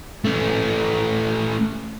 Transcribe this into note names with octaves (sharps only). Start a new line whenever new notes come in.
A3 C#4